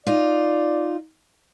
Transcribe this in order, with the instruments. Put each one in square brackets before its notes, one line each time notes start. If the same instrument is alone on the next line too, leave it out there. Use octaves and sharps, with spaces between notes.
[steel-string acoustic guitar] D#4 F4 [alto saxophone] D5